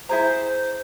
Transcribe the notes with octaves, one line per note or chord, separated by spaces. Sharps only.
E4 G#4 C5 A#5